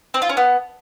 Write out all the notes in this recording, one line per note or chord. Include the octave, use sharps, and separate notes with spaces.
C4
F4
C#4
B3